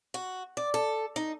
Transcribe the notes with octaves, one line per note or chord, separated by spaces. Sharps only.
F#4
D5
A4
D#4